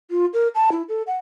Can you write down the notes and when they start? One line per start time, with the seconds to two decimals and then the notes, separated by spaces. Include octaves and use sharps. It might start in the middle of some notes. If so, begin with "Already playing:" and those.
0.11 F4
0.33 A#4
0.55 A5
0.72 E4
0.89 A4
1.07 F#5